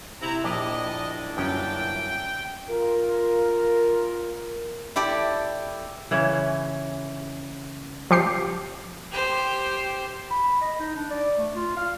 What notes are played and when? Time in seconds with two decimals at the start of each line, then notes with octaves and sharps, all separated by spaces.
0.21 C3 E4 A#5
0.44 A#1 A#2 D4 E4 G4 D5 D#5
1.37 G1 F#2 C#4 G5
2.69 F4 A#4
4.96 E4 G4 A4 D5
6.11 C#3 E3 C#4
8.11 F3 G4 C7
9.12 G4 C5
10.31 B5
10.61 D#5
10.80 D#4
10.96 D4
11.11 D5
11.38 A3
11.56 F4
11.77 F5